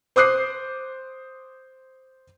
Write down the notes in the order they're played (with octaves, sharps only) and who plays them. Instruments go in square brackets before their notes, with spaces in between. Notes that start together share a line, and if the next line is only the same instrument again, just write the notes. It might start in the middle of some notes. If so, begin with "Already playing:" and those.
[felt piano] C5 D6 D#6 F#6 C7